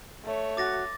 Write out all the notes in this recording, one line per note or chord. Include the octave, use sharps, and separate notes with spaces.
A3 C#5
F#4 D6 A6 A#6